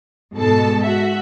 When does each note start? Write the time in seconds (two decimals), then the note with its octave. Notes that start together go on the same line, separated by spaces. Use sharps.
0.35 G#2 B2 A4 A5
0.83 F#4 E5